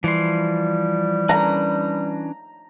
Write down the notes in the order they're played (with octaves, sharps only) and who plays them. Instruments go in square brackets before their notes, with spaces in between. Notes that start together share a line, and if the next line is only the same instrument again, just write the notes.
[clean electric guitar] E3 [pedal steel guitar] F3 C6 [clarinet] G3
[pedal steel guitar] C#4 D4 B4 [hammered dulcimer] A#5